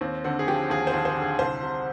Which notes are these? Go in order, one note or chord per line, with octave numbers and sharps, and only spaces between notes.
D#2 C4
D3 C4
G#4
F3 G4
D#2 G#4
C5
D#2
C5
D3
G#4
C2 C5
C3